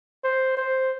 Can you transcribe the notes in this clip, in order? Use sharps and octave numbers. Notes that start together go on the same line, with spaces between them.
C5
C5